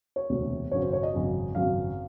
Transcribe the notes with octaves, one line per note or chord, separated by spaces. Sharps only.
C#5
E1 D2 C3
G#1 F#2 C#3 F#3 C#5
C5
C#5
D#5
G#1 F#2 C#3 F#3
G#1 F#2 C#3 F#3 F5